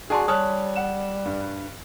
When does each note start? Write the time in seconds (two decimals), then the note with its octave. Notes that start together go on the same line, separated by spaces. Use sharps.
0.10 D4 F#4 G#4 D5 A5 C6
0.28 G3 C#5 A5 D#6 F#6
0.76 F#5 E7
1.26 G2